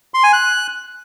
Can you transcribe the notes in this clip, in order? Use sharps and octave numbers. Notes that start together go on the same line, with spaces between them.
C6
G#5
F#6